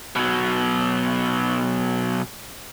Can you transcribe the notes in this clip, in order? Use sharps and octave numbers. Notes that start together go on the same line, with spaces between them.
B2 F#3